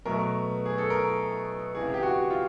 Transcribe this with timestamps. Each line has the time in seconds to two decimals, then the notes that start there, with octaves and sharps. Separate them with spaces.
0.05 B2 F#3 A3 A#4
0.66 G#4
0.78 A4
0.90 A#4
1.75 C#2 C3 E3 G#4
1.94 G4
2.03 F#4
2.30 F4